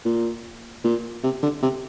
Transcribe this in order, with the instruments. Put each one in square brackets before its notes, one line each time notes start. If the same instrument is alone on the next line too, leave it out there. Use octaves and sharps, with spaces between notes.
[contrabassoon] A#2
A#2
C3
D3
C3